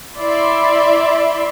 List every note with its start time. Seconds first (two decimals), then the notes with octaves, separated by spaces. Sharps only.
0.19 E4 D5 E5 B5 C6